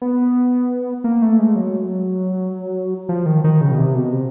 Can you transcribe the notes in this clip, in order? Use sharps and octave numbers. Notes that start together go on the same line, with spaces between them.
B3
A#3
A3
G#3
F#3
F3
D#3
D#3
C#3
B2
C3
B2
C3